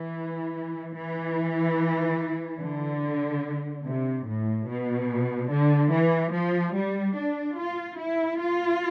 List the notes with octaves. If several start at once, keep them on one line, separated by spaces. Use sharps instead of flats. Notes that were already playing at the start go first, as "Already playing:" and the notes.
Already playing: E3
E3
D3
C3
A2
B2
D3
E3
F3
G3
D4
F4
E4
F4